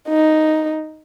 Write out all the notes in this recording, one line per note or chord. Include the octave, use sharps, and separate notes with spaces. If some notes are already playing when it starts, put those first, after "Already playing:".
D#4